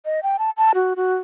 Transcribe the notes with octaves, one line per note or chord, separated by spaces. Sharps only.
D#5
G5
A5
A5
F#4
F#4